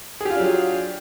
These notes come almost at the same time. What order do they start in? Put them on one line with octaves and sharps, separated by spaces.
G#4 G4 F4 D4 F#3